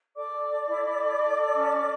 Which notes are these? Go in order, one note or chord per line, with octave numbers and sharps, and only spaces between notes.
A4 D5 D6
A4
A4
E4
E4
A4
A4
A4
C#4
C#4